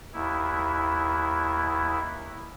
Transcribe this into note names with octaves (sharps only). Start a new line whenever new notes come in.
D#2 E4